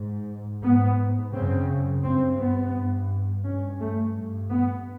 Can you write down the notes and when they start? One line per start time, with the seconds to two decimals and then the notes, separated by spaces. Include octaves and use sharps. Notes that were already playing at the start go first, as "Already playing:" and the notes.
Already playing: G#2
0.62 G#2 B3
1.33 F#2 C#3 C4
2.03 G2 C4
2.38 B3
2.74 G2
3.44 G2 C#4
3.79 A3
4.14 G2
4.50 B3